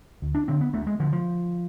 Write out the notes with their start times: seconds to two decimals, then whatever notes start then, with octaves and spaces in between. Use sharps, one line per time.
0.22 D2
0.35 D4
0.48 D3 C4
0.61 B3
0.73 D2 A3
0.87 G#3
1.00 D3 F3
1.13 F3